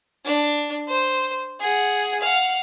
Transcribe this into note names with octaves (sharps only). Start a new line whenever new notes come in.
D4
C5
G#4 F#5
F5 F#5